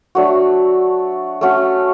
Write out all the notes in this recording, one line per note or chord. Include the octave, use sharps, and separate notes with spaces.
F#3 A3 D4 F#4
A3 C#4 F#4